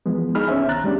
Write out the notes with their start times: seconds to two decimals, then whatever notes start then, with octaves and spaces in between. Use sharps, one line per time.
0.06 E3 F3 G#3 B3
0.35 D#4 G#4 B5 F6
0.47 B3 C#4 D#4 C5 E5 G#5
0.68 C2 D#3 A#5 F#6 A6
0.84 G3 G#3 B3 C#4 D4 G4